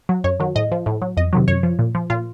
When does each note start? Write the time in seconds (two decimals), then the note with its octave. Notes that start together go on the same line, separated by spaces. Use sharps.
0.09 F#3
0.24 F#2 C#5
0.40 D#3 F#3
0.55 A2 D#5
0.72 F3
0.86 A2
1.02 F#3
1.17 F2 D#5
1.33 C3 D#3 F#3
1.48 F#2 C#5
1.63 F3
1.79 A#2
1.95 F3
2.10 A#2 F4